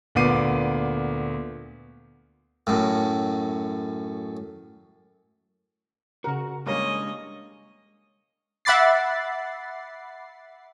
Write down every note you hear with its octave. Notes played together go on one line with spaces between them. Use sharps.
D2 A#2 B3 D6 C7 D#7
F#2 A2
C#3 F#4 A#4 F#5
G3 G#3 A#3 C#4 D4 C#5 D#5
E5 F#5 B5 D6 A6 C7